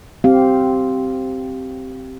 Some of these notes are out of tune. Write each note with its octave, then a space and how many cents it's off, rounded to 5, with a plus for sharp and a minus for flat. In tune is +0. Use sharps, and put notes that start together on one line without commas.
C4 +0 G4 -15 F5 +0